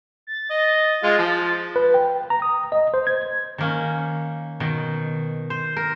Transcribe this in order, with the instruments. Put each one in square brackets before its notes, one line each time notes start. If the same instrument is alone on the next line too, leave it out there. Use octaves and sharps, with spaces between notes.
[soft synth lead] A6
[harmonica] D#5
G#3 F4
F3
[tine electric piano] B4
G5
A#5
D#6
D#5
C5
G#6
[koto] D#3 A#3 C#4
B2 D#3
C5
A#4